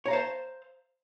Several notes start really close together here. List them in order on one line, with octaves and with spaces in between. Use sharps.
C#5 A#5 F5 C5 A5